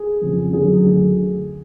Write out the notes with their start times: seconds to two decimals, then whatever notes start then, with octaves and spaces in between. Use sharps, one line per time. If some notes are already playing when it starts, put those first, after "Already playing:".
Already playing: G#4
0.21 F2 C#3 F3
0.53 F#2 D3 F#3 G#4
0.84 D2 D3 F#3